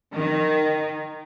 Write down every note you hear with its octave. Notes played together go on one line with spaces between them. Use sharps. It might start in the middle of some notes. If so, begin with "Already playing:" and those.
D#3